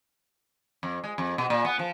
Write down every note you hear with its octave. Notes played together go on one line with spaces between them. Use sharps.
F2
G#3
F2
B2
A#2
B3
F3